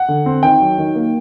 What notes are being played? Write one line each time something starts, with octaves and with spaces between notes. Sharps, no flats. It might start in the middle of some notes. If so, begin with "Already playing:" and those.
Already playing: F#5
D3
C4
D#3 G5
F#3
D#3
A#3